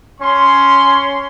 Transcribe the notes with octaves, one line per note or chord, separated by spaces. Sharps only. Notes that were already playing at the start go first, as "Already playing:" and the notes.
C#4 C6